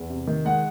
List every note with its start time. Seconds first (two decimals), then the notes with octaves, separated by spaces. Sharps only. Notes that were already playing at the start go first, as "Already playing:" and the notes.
Already playing: E2
0.10 C3
0.27 D#3
0.45 G#3 F#5